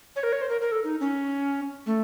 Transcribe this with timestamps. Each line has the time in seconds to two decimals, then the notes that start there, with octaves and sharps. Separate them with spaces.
0.16 C#5
0.23 A#4
0.33 C#5
0.42 C5
0.49 A#4
0.61 A#4
0.72 A4
0.84 D#4
1.00 C#4
1.86 A3